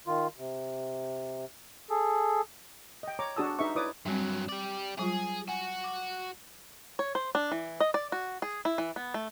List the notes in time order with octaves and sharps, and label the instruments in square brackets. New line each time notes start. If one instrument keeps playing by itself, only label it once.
[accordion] D#3 F4
C3
G#4 A4
[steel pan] D#5 G5
C#5 A#5 D6
D4 F#4 G#4 A5 D#6 E6
D#4 G#4 B4 D#5 E5 C#6
E4 B4 C#5 D5 D6 D#6
[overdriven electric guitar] G2 F#3 [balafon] G3 C4
[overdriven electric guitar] G4 D5
[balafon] F#3 G3 F4 [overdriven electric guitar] G#4
[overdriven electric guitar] F#4 [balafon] G#5
[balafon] D6
[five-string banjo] C#5
C5
D4
E3
D#5
D5
F#4
G#4
E4
E3
B3
A3